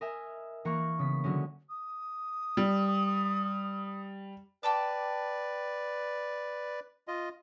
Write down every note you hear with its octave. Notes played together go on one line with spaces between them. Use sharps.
A#4 D#5 E5 G#5
E3 A#3 A#5 C#6 F#6
C#3 B3 B6
D3 F#3 G#3 C#4
D#6
G3
B4 D5 G5 A5 D6
F4 D#5